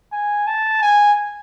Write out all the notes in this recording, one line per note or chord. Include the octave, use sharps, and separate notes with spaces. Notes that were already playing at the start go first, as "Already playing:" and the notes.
G#5
A5
G#5